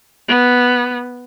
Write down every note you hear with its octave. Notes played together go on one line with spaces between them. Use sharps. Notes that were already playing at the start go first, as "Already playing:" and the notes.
B3